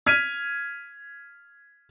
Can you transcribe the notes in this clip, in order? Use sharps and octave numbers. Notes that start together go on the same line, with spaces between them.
F6 G#6 B6 D#7